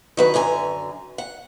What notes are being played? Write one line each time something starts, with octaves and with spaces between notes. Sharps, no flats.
D#3 F#3 B4
F#2 D3 G#5 A#5
F#5